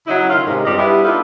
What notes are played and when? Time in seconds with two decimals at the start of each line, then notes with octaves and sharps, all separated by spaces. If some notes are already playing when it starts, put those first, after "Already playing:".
0.06 C#3 F#3 D#4 E4
0.29 D#3 C#4 F4
0.46 G#2 C3 D#3 G#3
0.64 G2 G3 C4 F4 D#5
0.77 G3 B3 D4 E4 G4
1.04 B3 D4 D#4 F4 A4